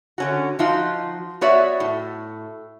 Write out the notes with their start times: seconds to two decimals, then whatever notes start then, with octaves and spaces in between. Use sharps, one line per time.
0.18 D3 C#4 F#4
0.59 F3 D#4 F4 F#4
1.41 B3 F#4 C#5 D5 E5
1.80 A2